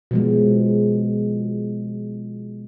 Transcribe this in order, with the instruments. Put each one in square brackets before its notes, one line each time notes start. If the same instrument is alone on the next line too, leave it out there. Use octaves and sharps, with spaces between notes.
[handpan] B2 F3 G#3